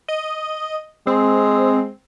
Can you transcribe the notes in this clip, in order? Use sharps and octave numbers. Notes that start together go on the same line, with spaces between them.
D#5
G#3 C4